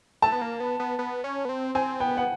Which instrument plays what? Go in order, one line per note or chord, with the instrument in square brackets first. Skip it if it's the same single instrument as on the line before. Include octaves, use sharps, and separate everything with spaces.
[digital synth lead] A3 [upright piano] A5
[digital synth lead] B3
A#3
B3
B3
B3
C#4
B3
C4
[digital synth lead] C4 [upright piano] G#5
[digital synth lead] B3 [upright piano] G5
[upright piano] F#5